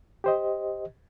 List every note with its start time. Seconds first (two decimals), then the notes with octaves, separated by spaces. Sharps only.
0.24 G4 C5 D#5